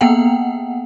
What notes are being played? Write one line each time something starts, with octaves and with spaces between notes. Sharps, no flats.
A#3 B3 F#5 G5